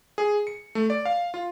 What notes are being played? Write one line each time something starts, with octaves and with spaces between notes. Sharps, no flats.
G#4
C#7
A3
D5
F5
F4